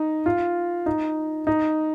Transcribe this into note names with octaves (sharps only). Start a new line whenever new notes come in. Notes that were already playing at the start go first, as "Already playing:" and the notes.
Already playing: D#4
F4
D#4
D#4